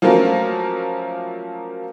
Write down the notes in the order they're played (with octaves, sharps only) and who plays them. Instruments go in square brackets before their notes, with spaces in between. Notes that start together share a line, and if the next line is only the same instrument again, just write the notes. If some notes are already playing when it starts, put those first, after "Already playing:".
[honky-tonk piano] F3 F#3 A3 A#3 C#4 A#4